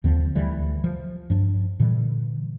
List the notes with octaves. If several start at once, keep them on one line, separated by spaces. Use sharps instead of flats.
D#2 D3 F3 C4
D2 D3 E3 G3
F3
G2 F3 D4
A#2 D3 E3 G3